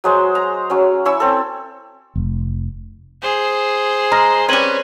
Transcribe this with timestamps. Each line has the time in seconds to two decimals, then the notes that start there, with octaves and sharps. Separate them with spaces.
0.04 F#3 G#3 C5
0.35 A#5
0.70 F#3 C#4
1.05 C#4 E4 C#6 E6
1.20 C4 A4
2.15 F1
3.22 G#4 C5
4.12 G#3 A#5 F6 A#6
4.49 G3 C4 C#4 B4 G#6 D#7 F#7